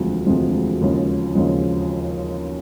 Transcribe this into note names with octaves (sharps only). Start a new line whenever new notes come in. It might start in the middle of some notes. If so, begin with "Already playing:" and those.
Already playing: E1 D2 C3 F3 G#3
E1 D2 C3 F3 G#3
D#2 C#3 F3 G#3
D#2 C#3 F3 G#3